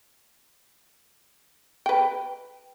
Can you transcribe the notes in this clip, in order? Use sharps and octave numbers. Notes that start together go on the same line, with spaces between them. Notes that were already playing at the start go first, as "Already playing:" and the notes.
B4 G5